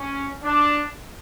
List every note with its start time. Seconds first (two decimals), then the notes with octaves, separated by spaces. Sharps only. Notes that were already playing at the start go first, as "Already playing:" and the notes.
Already playing: C#4
0.44 D4